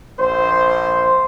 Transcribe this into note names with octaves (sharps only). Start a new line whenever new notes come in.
A#1 C5